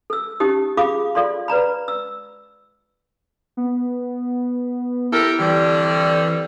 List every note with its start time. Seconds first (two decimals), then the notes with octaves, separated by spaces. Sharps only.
0.10 A4 E6
0.40 C#4 D#4 G4 D#6
0.77 F4 G#4 F5 B5 D6 D#6
1.15 F4 A4 D5 F5 C6
1.48 B4 D5 A#5 B5
1.88 E6
3.57 B3
5.12 E4 G4 A4 A#4
5.39 F2 D3 E3 G3